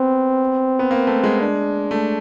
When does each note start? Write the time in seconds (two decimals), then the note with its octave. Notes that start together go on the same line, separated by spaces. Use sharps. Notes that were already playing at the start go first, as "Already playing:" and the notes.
Already playing: B3 C4
0.79 B3
0.91 A#3
1.07 A3
1.24 G#3
1.41 D4
1.91 A3